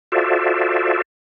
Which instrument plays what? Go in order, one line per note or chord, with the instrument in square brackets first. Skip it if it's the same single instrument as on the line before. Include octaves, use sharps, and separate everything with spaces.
[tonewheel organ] F4 F#4 A4 C5 D5 E5